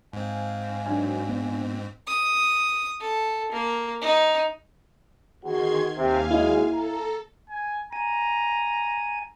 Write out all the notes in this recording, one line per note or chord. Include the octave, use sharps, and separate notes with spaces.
G#2 C4 F5 G#5
G2 D#3 F#3 D4 F5 G#5
A#1 B3
D#6
A4
A#3
D#4
E2 D#3 F#4 G#4 C6 G#6
D#2 C3 F5 G#5
F#3 G#3 E4
A4 A#5
G#5
G#5 A#5